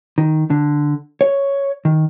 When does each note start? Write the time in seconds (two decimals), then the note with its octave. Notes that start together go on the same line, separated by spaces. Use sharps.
0.18 D#3
0.50 D3
1.21 C#5
1.85 D#3